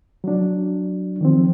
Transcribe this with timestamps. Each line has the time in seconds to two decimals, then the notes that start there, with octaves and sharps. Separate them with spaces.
0.24 F#3 D4
1.21 D#3 F3 C4